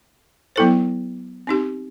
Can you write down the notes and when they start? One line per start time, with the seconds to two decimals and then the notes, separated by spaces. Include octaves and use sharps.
0.56 F#3 B3 E4 A4 C5
1.47 C4 D#4 G4